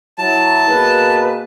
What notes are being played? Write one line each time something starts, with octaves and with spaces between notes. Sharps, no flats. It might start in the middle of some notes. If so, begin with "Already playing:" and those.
F#3 E4 A5
B2 A#3 G#4 B4